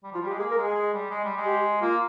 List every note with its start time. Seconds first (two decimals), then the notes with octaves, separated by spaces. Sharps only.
0.03 G3
0.12 F3
0.15 F4
0.21 G3
0.27 G4
0.30 G#3
0.39 A#3 G#4
0.51 A#4
0.57 G#3
0.63 G#4
0.74 G#3
0.93 G3
1.10 G#3
1.24 G3
1.37 G#3
1.46 G4
1.81 A#3 F4